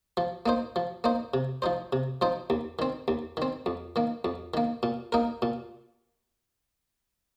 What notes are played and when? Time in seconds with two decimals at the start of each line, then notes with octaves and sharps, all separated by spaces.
0.17 F3
0.46 A#3 D#4 C5
0.76 F3
1.04 A#3 D#4 C5
1.34 C3
1.62 F3 D#4 C5
1.93 C3
2.22 F3 D#4 C5
2.50 D#2
2.79 D#3 C4
3.08 D#2
3.37 D#3 C4
3.66 F2
3.96 D#3 A#3
4.25 F2
4.54 D#3 A#3
4.83 A#2
5.12 A#3 D#4 A#4
5.42 A#2